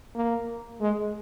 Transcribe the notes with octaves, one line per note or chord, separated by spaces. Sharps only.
A#3
G#3